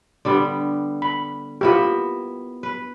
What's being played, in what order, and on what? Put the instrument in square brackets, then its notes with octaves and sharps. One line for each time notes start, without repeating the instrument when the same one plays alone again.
[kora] D3 G3 B3
[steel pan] B5
[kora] B3 E4 A#4 [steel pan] F4 G4
[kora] B4